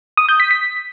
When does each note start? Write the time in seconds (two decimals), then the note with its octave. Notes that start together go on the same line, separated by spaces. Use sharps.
0.17 D#6
0.29 G6
0.40 B6
0.51 B6